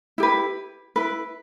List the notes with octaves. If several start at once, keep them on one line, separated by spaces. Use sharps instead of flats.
E4 G4 B4
E4 B4